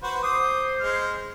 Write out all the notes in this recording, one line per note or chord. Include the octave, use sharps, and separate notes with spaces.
F#4 B4 C5
C5 D6 D#6
G#3 F6